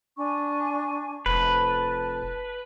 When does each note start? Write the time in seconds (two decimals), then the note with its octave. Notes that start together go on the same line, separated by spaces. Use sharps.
0.16 D4 G#5 C#6
1.26 F1 B4 A5